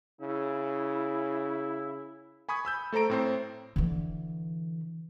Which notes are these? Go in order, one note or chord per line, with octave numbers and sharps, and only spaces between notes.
C#3 E4
G#5 B5 C#6 D#6 G#6
B5 E6 G6
A3 A4 C5 A#5 D7
A2 C4 C5
D3 E3